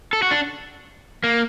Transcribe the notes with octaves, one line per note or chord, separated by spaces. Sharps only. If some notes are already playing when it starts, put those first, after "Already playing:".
A4
F#4
D4
A#3